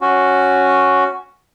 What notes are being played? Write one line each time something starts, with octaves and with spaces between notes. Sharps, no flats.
C#4 F#4